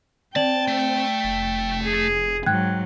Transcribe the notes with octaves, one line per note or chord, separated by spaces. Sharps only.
C4 D5 G5 A5 F#7
A3
F1
G#4
G#2 F#3 G5 F#6 G#6